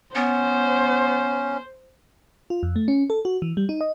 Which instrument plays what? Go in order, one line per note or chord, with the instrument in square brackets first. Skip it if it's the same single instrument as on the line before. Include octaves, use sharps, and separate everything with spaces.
[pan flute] B3 [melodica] C#4 [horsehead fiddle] C5
[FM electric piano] F4
F2
A3
C#4
A4
F#4
E3
G3
D#4
D#5